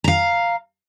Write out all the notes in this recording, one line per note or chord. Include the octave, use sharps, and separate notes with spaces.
F5 A#5